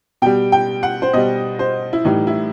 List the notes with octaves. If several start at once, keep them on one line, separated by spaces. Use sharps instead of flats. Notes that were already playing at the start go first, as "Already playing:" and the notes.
B2 G3 G5
G5
F#5
C5
B2 G3 D#5
C5
E4
A2 E3 G3 D#4
E4